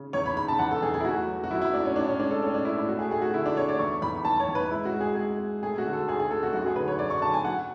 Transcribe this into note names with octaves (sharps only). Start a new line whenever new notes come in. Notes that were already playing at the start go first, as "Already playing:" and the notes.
Already playing: C#3
E2 C#5
B5
C#3 B5
A5
E2 F#5
A4
E2 G#4
G#4
E4
A3 F#4
F#3
F#4
F#2 E4
E4
A3 D4
C#4
A2 D4
C#4
G#3 D4
A4
A2 C#4
D4
A2 E4
D4
A3 F#4
G#4
A3 G#4
F#4
D3 E4
D4
A3 C#5
D5
E2 C#6
E2 B5
E2 A5
C#5
E2
B4
G#3 E4
F#4
G#3
G#4
G#3 G#4
G#3
A3 G#4
F#4
D3
A4
D2 G#4
G#4
A3 A4
F#4
F#2 F#4
G#4
D3 B4
C#5
F#2 D5
C#6
D3 A5
G#5
F#3 F#5